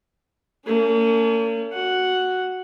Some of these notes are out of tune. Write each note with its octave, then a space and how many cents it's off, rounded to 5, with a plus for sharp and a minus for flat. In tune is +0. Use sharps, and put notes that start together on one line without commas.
A#3 -40 C#4 +40
F#4 +0 F#5 +0